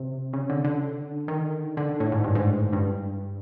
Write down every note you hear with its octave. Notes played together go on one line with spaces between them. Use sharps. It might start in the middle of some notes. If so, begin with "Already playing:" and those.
Already playing: C3
C#3
D3
D3
D#3
D3
A2
G#2
G2
G#2
G2